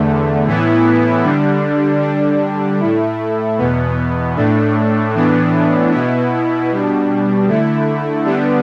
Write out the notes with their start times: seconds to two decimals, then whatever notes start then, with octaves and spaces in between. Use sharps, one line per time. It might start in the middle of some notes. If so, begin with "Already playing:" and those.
Already playing: E2 D3 A3
0.46 A2 E3 B3 E4
1.24 D3 G3 D4
2.02 D3 G3 D4
2.80 A2 A3 E4
3.58 E2 B2 B3
4.36 A2 A3 D4
5.13 A2 E3 B3 D4
5.92 B2 B3 E4
6.69 B2 G3 D4
7.47 D3 A3 E4
8.25 D3 G3 B3 D4